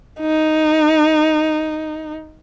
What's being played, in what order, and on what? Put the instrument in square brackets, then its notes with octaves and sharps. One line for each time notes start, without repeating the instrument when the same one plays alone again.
[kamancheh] D#4